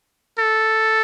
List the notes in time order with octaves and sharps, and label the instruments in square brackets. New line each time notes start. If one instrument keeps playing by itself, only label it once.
[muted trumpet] A4